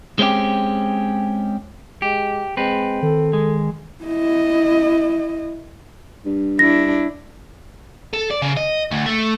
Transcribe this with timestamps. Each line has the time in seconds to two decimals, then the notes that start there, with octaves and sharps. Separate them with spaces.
0.19 G#3 C4 C#4 E4 G4
2.02 G#3 G4
2.57 G#3 C4 B4
3.02 D#3 A4
3.33 G#3
4.04 E4 D#5
6.25 G2
6.59 D4 E4 A#6
8.13 A4
8.30 D5
8.42 C#3
8.57 D#5
8.91 D2
9.06 A3